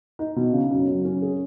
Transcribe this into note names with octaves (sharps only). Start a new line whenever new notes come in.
D#4
B2
C#3
F#2
F#3
C#4
G#4